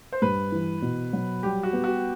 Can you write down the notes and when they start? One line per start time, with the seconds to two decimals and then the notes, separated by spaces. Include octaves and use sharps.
0.12 C5
0.22 G2 B4
0.52 E3
0.82 B2
1.13 F#3
1.43 G3 G4
1.63 F#4
1.73 B3
1.84 F#4